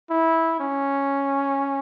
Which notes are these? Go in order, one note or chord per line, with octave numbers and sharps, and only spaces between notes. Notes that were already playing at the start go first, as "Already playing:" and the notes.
E4
C#4